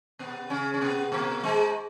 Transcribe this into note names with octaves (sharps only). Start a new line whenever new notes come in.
B2 B3
C#3 C#4
C#4
B2 B3
A#2 A#3
G#2 G#3